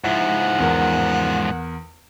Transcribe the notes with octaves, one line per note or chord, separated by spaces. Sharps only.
G#2 F3 E4 F#5
E2 A#4